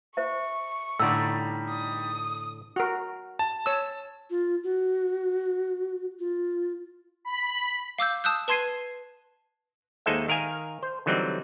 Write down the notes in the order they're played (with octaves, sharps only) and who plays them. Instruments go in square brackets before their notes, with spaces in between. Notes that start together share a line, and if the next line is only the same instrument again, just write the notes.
[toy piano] C5 E5 [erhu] C#6
[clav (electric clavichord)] A2 D3 [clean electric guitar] G3 D#4 D5 [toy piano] F#5 E6
[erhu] D#6
[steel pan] F#4 A#4
[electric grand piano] A5
[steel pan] C#5 E6
[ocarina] F4
F#4
F4
[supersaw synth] B5
[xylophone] F5 D6 E6 G6
A5 D#6 E6 F#6 G6
B4 A5 C6 G#6 C7 D#7
[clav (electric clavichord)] D#2 G#3 D#4 A4 C5 E5
D#3 A#4 F5 G#5
C5
D3 E3 F#3 G3 C4 D#4